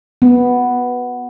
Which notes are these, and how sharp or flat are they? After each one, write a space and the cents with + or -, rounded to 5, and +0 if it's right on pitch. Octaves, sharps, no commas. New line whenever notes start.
B3 +0